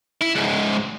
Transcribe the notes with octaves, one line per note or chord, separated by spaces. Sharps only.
E4
C#2 G#2